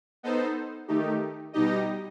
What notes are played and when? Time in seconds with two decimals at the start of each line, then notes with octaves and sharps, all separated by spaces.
0.23 B3 D#4 A4 C5
0.88 D#3 A3 D#4 G4
1.53 B2 G3 D#4 G4 D#5